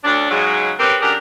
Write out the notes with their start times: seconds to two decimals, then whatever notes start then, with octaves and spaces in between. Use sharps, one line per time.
0.04 D2 C#4 D4
0.30 G#2 C#3 F#3 G#3
0.79 C4 C#4 G4 A#4 B4
1.00 F#2 D4 G4 G#4 A#4